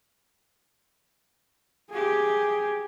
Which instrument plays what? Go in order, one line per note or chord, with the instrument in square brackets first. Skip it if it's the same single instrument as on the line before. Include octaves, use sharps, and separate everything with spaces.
[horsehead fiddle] G4 G#4